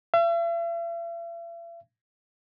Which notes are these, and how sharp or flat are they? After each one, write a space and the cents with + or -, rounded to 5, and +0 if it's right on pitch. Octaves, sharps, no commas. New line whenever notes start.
E5 +45